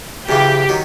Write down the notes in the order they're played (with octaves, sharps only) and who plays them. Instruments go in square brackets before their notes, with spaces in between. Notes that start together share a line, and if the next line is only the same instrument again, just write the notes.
[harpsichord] F#2 C#3 E3 [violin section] G4
[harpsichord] D#3 F#3